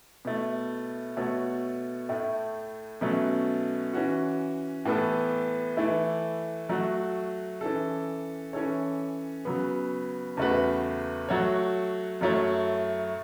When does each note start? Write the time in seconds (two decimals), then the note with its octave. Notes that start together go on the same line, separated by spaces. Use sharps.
0.25 B2 A3 E4
1.17 B2 A3 F#4 A4 C#5
2.09 A2 A3 E4
3.01 B2 F#3 A3 C#4
3.93 E3 C#4 F#4
4.85 A2 E3 B3 A4
5.77 E3 A3 E4
6.69 F#3 A3 F#4
7.61 E3 C#4 A4
8.53 E3 C#4 A4 C#5
9.45 C#3 F#3 B3
10.37 E2 C#3 A3 F#4 B4
11.29 F#3 A3 F#4 C#5
12.21 F#2 F#3 A3 E4 C#5